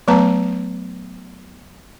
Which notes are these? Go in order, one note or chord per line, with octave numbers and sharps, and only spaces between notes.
F#3 A3 B3 B4 A5 A#5